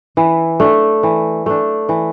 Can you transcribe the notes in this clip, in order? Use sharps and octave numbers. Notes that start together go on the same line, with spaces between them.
E3
A3 D4
E3
A3 D4
E3